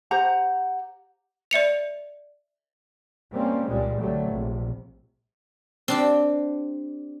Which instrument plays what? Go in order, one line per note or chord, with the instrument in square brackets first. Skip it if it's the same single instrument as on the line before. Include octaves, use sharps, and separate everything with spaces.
[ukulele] G4 C5 F#5 A#5
[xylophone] D5 E5 C#7 F7
[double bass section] G3 A#3 C4 C#4
C#2 A#2 G3 G#3
C2 D3 F#3 G3 A3
A#1 C3
[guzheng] C4 D4 G4